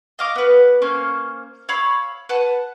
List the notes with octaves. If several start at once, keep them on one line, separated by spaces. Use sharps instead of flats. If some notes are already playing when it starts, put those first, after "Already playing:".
D#5 F5 D6
B3 B4
A#3 C#4 C5
C#5 F5 B5 E6
B4 F#5 A5